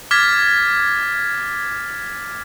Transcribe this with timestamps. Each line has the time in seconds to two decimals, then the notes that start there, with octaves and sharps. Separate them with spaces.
0.11 D6 F6 G#6 A6 B6